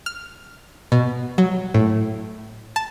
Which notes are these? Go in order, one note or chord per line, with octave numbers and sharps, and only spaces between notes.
F6
B2
F#3
A2
A5